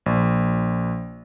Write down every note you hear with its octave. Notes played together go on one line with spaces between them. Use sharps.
A#1